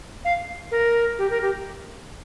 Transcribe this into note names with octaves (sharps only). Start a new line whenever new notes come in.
F5
A#4
G4
A#4
G4